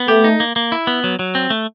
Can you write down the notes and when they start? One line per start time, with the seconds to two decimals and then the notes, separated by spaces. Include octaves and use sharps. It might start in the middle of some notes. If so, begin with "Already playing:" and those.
Already playing: B3
0.08 A3 G4
0.24 D#4
0.40 A#3
0.56 A#3
0.72 E4
0.87 B3
1.04 F#3
1.19 F#3
1.35 C4
1.50 A3